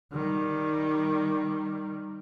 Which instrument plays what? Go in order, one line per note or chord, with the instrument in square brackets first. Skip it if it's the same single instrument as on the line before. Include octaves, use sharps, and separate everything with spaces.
[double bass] D#3 G3